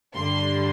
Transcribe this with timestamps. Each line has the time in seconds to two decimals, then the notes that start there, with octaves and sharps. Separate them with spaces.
0.15 G2 D3 G3 D4 C6